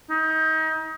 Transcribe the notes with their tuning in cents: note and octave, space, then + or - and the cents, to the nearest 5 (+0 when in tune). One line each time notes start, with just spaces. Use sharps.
D#4 +30